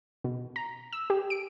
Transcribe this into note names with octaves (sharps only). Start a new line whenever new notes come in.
B2
A#5
E6
G4
D7